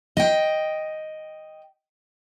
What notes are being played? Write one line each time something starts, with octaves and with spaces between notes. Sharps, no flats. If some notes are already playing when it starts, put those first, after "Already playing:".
D#5 G5